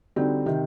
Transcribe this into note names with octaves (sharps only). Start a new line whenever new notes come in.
D3 G3 C4 D#4 F#4
C3 D#3